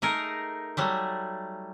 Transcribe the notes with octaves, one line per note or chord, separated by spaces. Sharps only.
A3 D#4 G#4 A#4
F#3 G3 A3